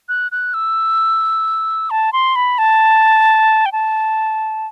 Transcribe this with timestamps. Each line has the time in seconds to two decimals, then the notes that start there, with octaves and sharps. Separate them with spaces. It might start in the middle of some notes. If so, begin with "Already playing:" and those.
0.09 F#6
0.32 F#6
0.54 E6
1.90 A5
2.13 C6
2.36 B5
2.58 A5
3.66 G5
3.72 A5